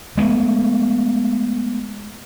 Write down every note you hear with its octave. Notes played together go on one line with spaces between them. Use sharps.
G#3 A3 B3